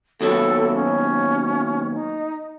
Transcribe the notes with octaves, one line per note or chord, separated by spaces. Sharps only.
D#2 B2 F#3 A4
C#4
D#4